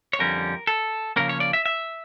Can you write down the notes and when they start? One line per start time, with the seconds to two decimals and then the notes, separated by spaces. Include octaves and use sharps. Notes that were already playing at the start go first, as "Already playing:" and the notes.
0.13 C#5
0.19 F2 D3 G3 C#4 A#4
0.67 A4
1.16 C#3 F3 A#3 C#4 A#4
1.29 C#5
1.40 D5
1.53 E5
1.66 E5